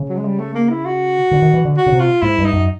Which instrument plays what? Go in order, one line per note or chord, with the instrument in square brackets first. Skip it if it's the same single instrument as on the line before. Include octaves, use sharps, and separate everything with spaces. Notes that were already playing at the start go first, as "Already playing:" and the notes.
Already playing: [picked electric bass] C#3
[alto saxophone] F#3
G#3
G3
A3
A#3
E4
F#4
[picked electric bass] D3
D#3
E3
D3
[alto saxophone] F#4
[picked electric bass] C#3
C3
[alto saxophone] F4
[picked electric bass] G#2 [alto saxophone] E4
[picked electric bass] G2
[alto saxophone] D#4
[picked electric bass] F#2